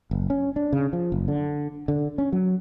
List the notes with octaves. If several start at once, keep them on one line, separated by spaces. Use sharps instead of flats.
F#1
C#4
D4
C#3
F3
F#1
D3
D3
C#4
F#3